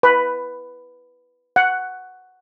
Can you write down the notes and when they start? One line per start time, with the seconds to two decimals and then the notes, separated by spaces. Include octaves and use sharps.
0.03 B4
1.56 F#5